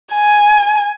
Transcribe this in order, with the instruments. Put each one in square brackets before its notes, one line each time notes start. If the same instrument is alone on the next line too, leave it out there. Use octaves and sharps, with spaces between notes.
[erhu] G#5